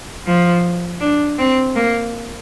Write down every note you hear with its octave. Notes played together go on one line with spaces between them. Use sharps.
F3
D4
C4
A#3